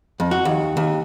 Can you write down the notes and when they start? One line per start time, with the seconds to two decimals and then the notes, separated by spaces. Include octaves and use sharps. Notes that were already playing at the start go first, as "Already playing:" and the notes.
0.20 F2
0.31 F#4
0.45 D#2
0.77 D#2